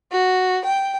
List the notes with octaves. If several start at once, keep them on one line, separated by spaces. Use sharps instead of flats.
F#4
G5